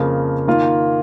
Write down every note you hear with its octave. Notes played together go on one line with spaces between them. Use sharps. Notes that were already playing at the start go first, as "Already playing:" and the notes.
Already playing: F2 C#3 F3 A#3
D#3 A#3 F4